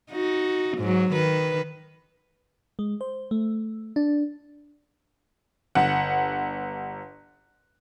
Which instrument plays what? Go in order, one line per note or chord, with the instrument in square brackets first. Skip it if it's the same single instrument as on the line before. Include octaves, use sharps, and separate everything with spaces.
[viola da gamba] D#4 F#4
G#2 F#3
D#3 B4
[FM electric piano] G#3
C5
A3
D4
[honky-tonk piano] G1 F#5